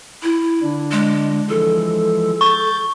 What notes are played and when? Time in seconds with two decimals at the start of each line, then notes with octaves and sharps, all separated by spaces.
0.23 E4
0.62 D3 D4
0.92 G#3
1.49 E3 F3 G#3 A4
2.41 C#6 G6 A6